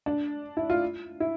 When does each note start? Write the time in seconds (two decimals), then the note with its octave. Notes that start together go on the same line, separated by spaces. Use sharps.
0.06 D4
0.57 E4
0.70 F4
1.20 E4